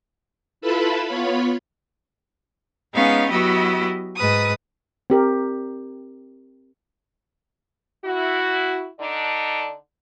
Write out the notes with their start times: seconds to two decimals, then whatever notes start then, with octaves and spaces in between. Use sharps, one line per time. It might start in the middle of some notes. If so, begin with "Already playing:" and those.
0.61 E4 F4 A4 B4 A5 B5
1.06 B3 F4 C#5 B5
2.93 G#3 B3 C#4 D#4 B4 F5
3.29 F#3 B3 E4 F#4 G4 D#5
4.16 G#2 B4 D#6
5.10 C4 G4 A#4
8.05 E4 F#4
8.99 D3 D4 D#4 D5